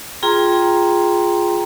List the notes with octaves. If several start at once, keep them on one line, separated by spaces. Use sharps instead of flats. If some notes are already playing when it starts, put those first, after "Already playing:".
F4 G#4 G5 A#5 C6